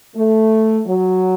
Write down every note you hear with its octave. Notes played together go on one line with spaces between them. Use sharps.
A3
F#3